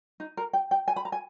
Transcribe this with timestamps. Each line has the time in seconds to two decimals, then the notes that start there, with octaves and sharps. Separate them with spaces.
0.20 D#4
0.37 A#4
0.53 G5
0.71 G5
0.88 G#5
0.96 B5
1.05 A#5
1.12 G#5